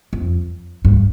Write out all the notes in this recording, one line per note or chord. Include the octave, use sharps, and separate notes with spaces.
F2
G2